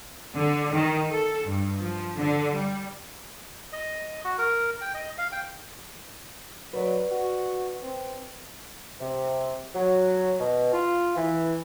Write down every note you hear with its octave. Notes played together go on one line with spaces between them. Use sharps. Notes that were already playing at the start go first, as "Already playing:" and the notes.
D3
D#3
A4
G2
F3
D3
G3
D#5
F#4
A#4
G5
D#5
F5
G5
F#3 B4 D5
F#4
C4
C3
F#3
B2
F4
E3